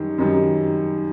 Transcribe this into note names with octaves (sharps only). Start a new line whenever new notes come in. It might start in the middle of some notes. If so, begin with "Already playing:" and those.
Already playing: F#2 D#3 G3
F#2 D#3 G3